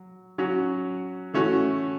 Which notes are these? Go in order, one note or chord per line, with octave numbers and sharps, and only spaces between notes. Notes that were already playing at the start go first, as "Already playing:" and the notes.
Already playing: F#3
F#3 C#4 F#4
E3 A3 C#4 F#4